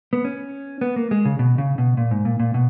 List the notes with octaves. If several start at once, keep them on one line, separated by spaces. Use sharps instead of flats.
B3
C#4
B3
A#3
G#3
C#3
B2
C#3
B2
A#2
G#2
A#2
A#2
B2